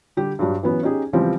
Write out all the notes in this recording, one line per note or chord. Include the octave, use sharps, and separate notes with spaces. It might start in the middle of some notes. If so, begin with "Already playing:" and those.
D3 G3 G4
G2 F#3 G3
E3 F#3 B3 C#4
C#4 D#4 G4 G#4
C#2 E3 F3 G3 C4